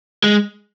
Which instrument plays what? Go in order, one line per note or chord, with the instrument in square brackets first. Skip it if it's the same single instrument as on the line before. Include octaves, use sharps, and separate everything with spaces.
[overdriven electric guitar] G#3